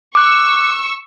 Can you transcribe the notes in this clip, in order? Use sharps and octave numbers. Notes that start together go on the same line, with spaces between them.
C#6 D6 E6 F#6